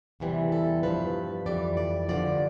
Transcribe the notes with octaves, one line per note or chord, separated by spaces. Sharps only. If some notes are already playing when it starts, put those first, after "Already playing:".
E2 C3 E3 G3
A4
G2 F3 B4
F2 E3 G3 D5
D5
G2 D3 F3 D5